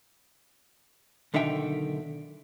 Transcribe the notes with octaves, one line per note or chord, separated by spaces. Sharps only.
B1 D3 D#3 E5 G5